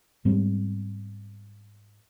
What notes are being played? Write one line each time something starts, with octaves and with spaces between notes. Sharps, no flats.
G#2 G3 B3 C4